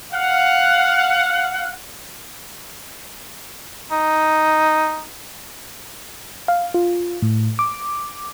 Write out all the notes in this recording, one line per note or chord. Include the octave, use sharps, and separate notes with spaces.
F5 F#5
D#4
F5
F4
A2
D6